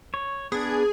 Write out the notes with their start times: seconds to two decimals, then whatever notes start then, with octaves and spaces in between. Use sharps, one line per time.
0.14 C#5
0.52 B3 D4 G#4